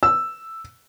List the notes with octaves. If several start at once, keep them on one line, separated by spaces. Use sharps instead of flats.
E6